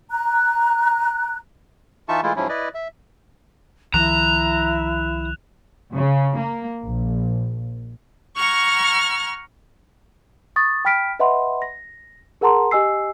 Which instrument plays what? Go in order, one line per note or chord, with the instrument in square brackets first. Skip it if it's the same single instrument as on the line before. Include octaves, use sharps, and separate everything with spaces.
[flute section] A#5 F#6
[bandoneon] E3 D#4 F4 E5 A5 C#6
E3 G#3 A3 E4 F4
G#2 F3 F#3 C#4 E4
E4 B4 D5 D#5
E5
[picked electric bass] C2 D#3 F3 [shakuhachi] E4 [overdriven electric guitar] A#5 [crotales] F#6 E7 F7
[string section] C#3
A#3
A#1
[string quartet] F#5 A#5 C#6 F6 G#6
[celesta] C#6 D#6 A6
G5 B5 F6 B6 D7
B4 D#5 E5 F#5 B5 C6
A#6
G#4 A#4 F#5 A5 A#5 C6
G4 D#5 G#5 E6 C7